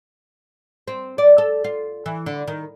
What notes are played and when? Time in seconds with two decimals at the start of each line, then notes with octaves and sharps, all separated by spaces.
0.88 C4
1.18 D5
1.38 A4
1.64 F4
2.06 E3
2.26 D3
2.48 D#3